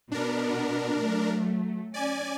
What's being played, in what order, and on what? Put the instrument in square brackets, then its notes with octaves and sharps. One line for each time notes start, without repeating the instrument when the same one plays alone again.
[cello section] B2 B3 [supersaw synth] D4 A#4
[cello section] F#3 A3
[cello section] C#4 [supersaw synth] D5 G#5